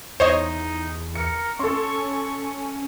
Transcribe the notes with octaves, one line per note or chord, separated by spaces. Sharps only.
E2 D#4 C5 C#5 D#5
A#4 C#7
C#4 A4 C6 C#6